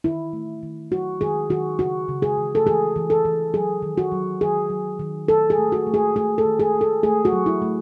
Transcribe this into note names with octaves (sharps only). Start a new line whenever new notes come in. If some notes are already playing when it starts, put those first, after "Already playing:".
D#3 E4
A3
D#3
F#3 F#4
D#3 G#4
D#3 F#4
C#3 F#4
C#3
G#4
E3
A4
E3 G#4
E3
A4
E3
F#3 G#4
D#3
F#4
F#3
D#3 G#4
F#3
D#3
A3 A4
G#4
A3
F#4
A3
G#4
A3 G#4
A4
D#3
G#4
A3
A4
A3 G#4
F#4
F#3
E4
A3